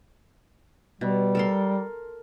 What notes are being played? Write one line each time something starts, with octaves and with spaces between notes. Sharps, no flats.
B2 G3
A4 A#4 C6